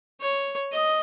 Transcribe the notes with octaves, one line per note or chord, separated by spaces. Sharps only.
C#5
D#5